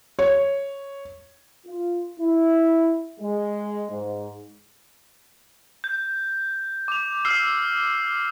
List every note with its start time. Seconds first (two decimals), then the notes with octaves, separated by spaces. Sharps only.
0.19 C#5
1.67 F4
2.19 E4
3.20 G#3
3.90 G#2
5.84 G6
6.88 D6 F7
7.25 E6 F6 C7 G7